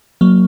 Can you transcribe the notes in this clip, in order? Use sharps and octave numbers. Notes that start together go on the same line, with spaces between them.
F#3 A#3